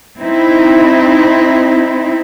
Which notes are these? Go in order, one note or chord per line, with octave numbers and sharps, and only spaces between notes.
C4 D#4 E4